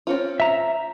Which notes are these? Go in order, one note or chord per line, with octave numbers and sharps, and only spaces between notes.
C4 C#4 F4
E5 A#5